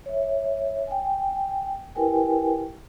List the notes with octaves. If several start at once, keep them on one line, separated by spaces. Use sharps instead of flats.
C#5 E5
G5 G#5
E4 G4 A#4 B4 G5 G#5